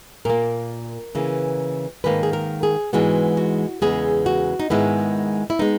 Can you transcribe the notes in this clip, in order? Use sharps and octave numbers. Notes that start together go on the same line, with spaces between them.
A#2 A#3 A#4
C#3 E3 A#3
G#2 D#3 A#3 B4
G#4
A#4
G#4
G#2 E3 G#3 B3 F#4
F#4
E2 C#3 G#3 B3 G#4
F#4
D#4
G#2 D#3 G#3 B3 E4
E4
G#3 B3 D#4